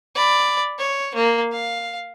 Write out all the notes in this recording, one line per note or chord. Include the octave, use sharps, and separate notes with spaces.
D5 B5
C#5
A#3
F5